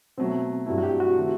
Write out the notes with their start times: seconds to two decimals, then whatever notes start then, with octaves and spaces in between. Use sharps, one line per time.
0.18 B2 F#3 A3 C4
0.66 G2 F#3 A3 E4
0.78 F#4
0.83 G4
1.00 F#4
1.16 D#3 A3 C4